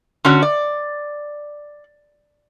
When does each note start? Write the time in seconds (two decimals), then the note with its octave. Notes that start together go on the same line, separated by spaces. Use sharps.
0.25 D3 C#4 F#4
0.43 D5